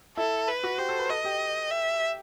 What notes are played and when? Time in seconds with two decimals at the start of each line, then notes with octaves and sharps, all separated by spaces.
0.17 E4 A4
0.48 B4
0.64 F#4
0.78 G4 C5
0.89 A4
0.99 B4
1.09 A4 D#5
1.25 G4
1.71 E5